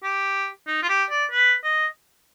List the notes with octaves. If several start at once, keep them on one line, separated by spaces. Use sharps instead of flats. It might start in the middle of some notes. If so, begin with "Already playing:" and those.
G4
D#4
F4
G4
D5
B4
D#5